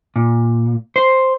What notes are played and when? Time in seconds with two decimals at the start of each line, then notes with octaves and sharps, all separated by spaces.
0.16 A#2
0.96 C5